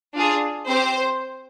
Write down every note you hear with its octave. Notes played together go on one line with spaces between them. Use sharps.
D4 F4 G#4
C4 G4 C5